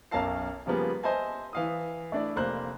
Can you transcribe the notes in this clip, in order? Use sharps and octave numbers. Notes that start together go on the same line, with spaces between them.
B1 F#2 A#4 F5 A5 C7
C#3 F3 G3 A#3 B3 G#4
C5 D#5 E5 G#5 A5
E3 F5 D#6
A3 D4 E4 D5
F1 A#3 C5 F#6